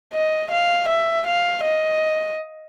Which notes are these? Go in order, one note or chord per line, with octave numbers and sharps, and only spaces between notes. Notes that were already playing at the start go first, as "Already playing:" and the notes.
D#5
F5
E5
F5
D#5